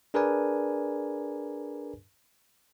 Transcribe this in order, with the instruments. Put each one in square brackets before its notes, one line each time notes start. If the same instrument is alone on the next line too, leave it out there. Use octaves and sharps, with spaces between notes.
[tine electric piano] D4 G#4 A#4 B4 D5 G#5